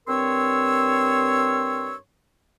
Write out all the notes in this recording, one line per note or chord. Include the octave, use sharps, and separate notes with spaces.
G2 C4 A#4 C#5 C6 E6